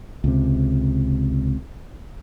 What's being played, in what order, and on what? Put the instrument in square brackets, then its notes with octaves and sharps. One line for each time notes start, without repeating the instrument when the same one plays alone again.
[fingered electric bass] C#2 C3